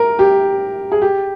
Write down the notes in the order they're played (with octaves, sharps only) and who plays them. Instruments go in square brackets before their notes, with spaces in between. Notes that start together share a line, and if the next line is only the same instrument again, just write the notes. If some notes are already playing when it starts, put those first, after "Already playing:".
Already playing: [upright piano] A#4
G4
G#4
G4